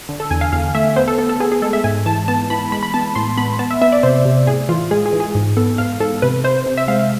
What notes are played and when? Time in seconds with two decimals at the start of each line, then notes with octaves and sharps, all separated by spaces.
0.09 D3
0.20 A4
0.31 E2 G#5
0.41 F5
0.52 E2 F5
0.75 A3 E5
0.96 B3 C5
1.08 A4
1.18 B3 A4
1.29 A4
1.40 B3 G#4
1.52 G#4
1.62 G#3 A4
1.73 E5
1.84 G#2 G#5
2.06 E3 A5
2.28 B3 A5
2.50 E3 B5
2.72 G#3 B5
2.83 B5
2.94 B3 A5
3.15 A2 C6
3.37 B3 B5
3.59 B3 A5
3.71 E5
3.82 B3 E5
3.92 D5
4.03 C3 C5
4.25 C3
4.47 A2 G#4
4.69 E3 F4
4.91 G#3 G#4
5.06 G#4
5.13 E3
5.20 G#4
5.35 G#2
5.57 B3 A4
5.78 G#2 F5
6.00 G#2 A4
6.22 C3 B4
6.44 C3 C5
6.66 C3
6.77 E5
6.88 G#3 F5
6.99 F5